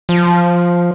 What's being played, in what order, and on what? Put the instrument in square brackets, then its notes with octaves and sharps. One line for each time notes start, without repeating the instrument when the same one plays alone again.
[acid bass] F3